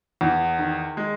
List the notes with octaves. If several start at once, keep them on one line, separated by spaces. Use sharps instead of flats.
E2
D#3
G#3